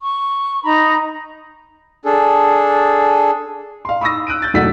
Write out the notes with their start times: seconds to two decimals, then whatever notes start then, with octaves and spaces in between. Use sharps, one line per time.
0.01 C#6
0.64 D#4 A#5 B5
2.05 D4 G#4 A4
3.85 F5 C6
4.01 B5 C#6 D#6 E6 A#6
4.27 E6 F#6 D7 D#7
4.42 G6 A6
4.54 E1 F#3 A3 F#5 E6 B6